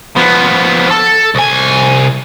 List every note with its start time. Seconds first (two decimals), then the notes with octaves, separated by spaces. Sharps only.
0.16 F3 B3
0.91 A4
1.35 C2 G#5